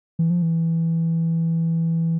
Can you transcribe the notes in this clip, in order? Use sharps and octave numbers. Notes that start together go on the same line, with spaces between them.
E3
F3
E3